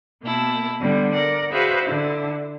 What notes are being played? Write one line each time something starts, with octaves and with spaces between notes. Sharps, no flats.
B2 A#3 E4 A5
D3 G3 B3
A#4 D5 F#5
F#4 G#4 B4 C5 E5 F5
D3 E4